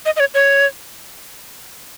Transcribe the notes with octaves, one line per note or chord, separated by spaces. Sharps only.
D#5
D#5
C#5
C#5